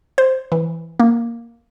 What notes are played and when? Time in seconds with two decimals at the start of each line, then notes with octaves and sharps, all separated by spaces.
0.18 C5
0.52 E3
1.00 A#3